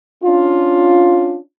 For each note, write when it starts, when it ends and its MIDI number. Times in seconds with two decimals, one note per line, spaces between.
0.24 1.39 61
0.24 1.39 62
0.24 1.39 65